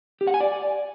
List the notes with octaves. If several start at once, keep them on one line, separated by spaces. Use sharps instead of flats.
G4
F#5
G#5
D5